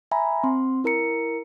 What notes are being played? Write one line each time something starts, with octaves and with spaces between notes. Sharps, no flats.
E5 G#5 A#5 B5
C4 C6
E4 A#4 A#5 C#7